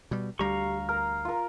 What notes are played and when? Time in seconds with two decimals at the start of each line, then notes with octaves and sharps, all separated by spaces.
0.11 B2 G3
0.39 D2 G3 G4 F5 A#5 C#6
0.89 A#4 F6
1.25 F4 A#4